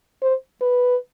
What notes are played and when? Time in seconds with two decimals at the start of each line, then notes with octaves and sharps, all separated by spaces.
0.22 C5
0.61 B4